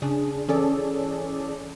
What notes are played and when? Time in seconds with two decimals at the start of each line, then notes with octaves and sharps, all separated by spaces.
0.02 C#3 D4 G#4
0.48 E3 C#4 G#4 A4 D5